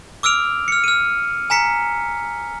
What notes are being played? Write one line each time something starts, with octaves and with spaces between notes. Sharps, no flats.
D6 E6 F6 D7 F7
F6 C#7
F6 D#7
G#5 A#5 B6 C#7